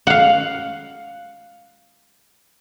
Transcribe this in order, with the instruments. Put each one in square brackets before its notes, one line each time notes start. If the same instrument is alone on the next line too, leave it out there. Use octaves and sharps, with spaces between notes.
[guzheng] F5 F#5